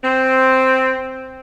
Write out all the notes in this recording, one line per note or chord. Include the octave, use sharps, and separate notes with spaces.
C4